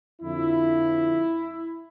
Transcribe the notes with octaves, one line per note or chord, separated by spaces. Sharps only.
F2 D3 F3 E4